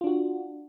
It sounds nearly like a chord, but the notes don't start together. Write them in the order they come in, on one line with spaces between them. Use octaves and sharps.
F4 D4 F#4